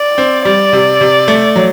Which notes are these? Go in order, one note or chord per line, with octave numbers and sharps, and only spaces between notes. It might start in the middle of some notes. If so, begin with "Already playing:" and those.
Already playing: D5
C4
G3 D5
C3
C3
A3
F#3